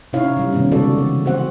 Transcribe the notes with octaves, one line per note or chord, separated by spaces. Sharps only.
C3 C#4 D#4 E4 C#5 F5
D3 G3
C3 D#3 B3 C#4
C#3 G#3 F#4 A4 D5
C#3 E3
C4 F#4 C5 F#5